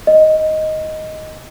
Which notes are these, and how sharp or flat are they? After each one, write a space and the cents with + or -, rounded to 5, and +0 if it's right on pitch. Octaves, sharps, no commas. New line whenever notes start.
D#5 +5